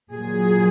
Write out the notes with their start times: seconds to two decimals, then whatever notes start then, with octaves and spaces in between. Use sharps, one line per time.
0.11 A#2 F#3 G#4